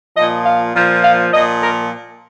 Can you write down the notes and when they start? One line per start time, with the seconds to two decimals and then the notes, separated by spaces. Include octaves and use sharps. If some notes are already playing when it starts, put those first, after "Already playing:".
0.16 A#2 F3 D#5
0.45 F5
0.73 A#2 F3
1.02 F5
1.31 A#2 F3 D#5
1.61 A#4